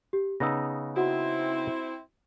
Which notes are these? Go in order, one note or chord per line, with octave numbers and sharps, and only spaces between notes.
G4
C#3 B3 D#4 E6 A#6
C4 E4 F#4 F#5